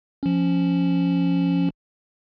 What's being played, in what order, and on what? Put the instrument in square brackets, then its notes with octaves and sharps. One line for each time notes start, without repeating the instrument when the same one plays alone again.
[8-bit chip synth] F3 C#4